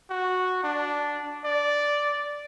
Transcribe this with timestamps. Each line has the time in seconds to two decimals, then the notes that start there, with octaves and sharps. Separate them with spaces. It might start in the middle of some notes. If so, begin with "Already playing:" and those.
0.10 F#4
0.64 D4
1.45 D5